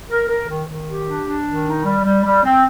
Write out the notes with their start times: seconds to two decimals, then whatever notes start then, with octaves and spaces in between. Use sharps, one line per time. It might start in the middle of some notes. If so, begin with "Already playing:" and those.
0.09 A#4
0.28 A#4
0.48 D#3
0.67 D#3
0.87 G4
1.06 D4
1.26 D4
1.45 D#3
1.65 D#4
1.84 G3
2.04 G3
2.24 G3
2.43 C4